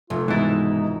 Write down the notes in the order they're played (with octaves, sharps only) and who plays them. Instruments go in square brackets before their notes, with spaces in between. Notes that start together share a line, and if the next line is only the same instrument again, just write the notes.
[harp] F1 [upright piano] A3 [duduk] F4
[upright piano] G#2 B2 A6 [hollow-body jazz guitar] E3 E4 [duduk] D#4